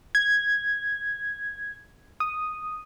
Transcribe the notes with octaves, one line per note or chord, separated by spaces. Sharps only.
G#6
D#6